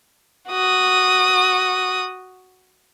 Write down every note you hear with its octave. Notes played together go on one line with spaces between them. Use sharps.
F#4 D#6